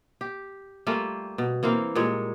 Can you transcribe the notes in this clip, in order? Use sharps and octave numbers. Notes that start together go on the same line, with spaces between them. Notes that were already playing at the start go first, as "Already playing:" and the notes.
G4
G3 A3 A#3 F4
B2
E3 A#3 C4 F5
A#2 G3 G#3 C#5